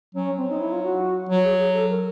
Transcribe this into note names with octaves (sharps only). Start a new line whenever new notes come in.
F#3 C#4
F#3 C4
D#4
E4
F4
F#4
F#3 F#4
G#4
G#4
A4
A#4